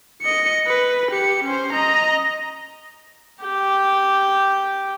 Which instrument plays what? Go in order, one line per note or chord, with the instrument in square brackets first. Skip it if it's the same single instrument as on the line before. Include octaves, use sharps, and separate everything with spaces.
[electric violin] D#5 C#7
B4
G4 C#7
C#4 C5
D#5 A#5
[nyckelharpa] G4 G5